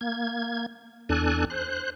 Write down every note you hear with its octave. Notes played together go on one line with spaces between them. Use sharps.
A#3 G#6
E2 D4 A4 G#5 F#6
C5 F#6